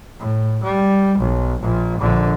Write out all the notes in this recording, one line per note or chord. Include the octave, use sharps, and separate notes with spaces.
A2
G3
B1
A#1 A#2
A#1 D3